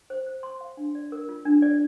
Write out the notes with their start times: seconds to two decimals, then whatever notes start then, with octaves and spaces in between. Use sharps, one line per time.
0.10 C5
0.27 C5
0.43 C6
0.61 F5
0.77 D4
0.95 D5
1.12 A#4
1.29 F4
1.45 D4
1.62 D5